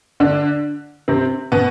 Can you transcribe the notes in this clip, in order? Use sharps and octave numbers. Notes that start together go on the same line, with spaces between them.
D3 D4
C3 C4
B2 B3